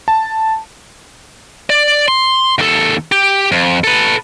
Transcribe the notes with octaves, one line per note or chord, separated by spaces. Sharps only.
A5
D5
C6
D#2 A4
G4
F2
A4 B4